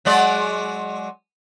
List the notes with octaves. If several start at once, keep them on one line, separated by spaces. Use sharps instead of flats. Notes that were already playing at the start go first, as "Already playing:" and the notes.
F#3 G#3 D5